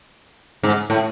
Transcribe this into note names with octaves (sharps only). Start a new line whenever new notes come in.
G#2
A2